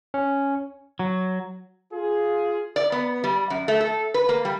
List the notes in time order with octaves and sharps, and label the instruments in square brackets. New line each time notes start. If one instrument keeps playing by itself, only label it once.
[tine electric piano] C#4
[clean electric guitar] F#3
[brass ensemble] F4 G#4
[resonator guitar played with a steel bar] D5
B3
G3
F#2
A3
A4
B4
A#3
G3